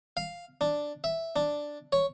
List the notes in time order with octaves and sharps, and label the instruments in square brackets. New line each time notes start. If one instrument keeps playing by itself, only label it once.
[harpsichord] F5
D4
E5
D4
C#5